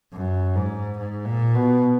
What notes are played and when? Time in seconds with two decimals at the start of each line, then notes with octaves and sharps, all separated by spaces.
0.13 F#2
0.55 G#2
0.98 G#2
1.25 A#2
1.54 B2